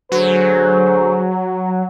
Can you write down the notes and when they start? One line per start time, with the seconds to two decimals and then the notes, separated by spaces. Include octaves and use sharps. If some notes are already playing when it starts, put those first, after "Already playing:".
0.12 D2 F#3 G#4 C5